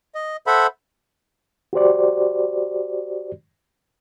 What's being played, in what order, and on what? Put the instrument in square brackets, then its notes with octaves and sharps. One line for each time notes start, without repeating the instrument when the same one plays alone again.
[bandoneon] D#5
A4 C5 E5 F#5 B5
[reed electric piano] F#4 G4 C5 D5